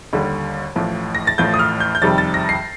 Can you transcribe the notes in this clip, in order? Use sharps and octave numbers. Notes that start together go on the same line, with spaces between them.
D#2 D3 G3
A1 A2 F3
A#6
A6
A1 A2 F3 G6
D#6
F6
G6
G6
F2 C3 D#3 G3 A6
A6
A#6
C7